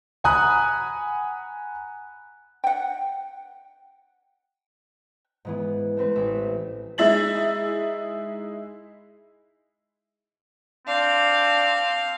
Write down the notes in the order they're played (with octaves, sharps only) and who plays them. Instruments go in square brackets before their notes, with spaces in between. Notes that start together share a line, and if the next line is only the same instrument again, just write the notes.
[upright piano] F#5 G#5 A#5 B5 D#6 F#6
[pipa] F#5 G5
[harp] G#2 E3 B3
A3 C4 B4
A1 E5
[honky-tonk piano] G#3 D#4 E4 E5 A6 F#7
[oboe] C4 [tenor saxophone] D4 [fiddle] F5